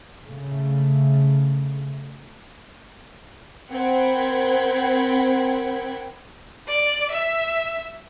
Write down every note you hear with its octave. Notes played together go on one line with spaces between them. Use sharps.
C#3 A3
C4 A#4 F#5 G5 B5 G#6
D5
E5